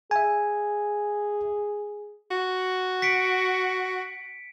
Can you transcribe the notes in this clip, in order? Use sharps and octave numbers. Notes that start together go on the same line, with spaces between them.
G#4 E5 G#5
F#4
B6 C#7 D7